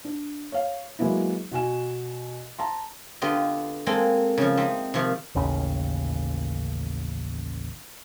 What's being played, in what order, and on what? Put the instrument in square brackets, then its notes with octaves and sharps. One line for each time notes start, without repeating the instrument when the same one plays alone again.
[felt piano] D4
C#5 F5
F#3 G#3 A#3 B3 E4
B2 F#4 G#5 E7
A5 A#5 C6
[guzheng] D3 B3 F4 G4 D#5
G#3 A#3 C4 A4
C#3 F3
C4 D#4 E5
C3 D#3 F3
[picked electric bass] A1 D#2 C#3